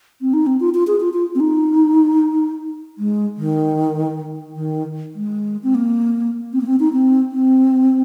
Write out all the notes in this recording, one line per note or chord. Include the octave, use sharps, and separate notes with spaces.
C4
D#4
C4
F4
F4
G#4
F4
F4
C4
D#4
G#3
D#3
D#3
G#3
C4
A#3
C4
A#3
C4
D#4
C4
C4